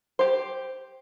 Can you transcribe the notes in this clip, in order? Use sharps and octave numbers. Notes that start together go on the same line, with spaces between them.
G4 C5